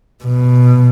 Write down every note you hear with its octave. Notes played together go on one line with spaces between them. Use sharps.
B2